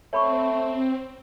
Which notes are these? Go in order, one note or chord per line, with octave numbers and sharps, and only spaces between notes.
A3 C4 C#5 B5 C#6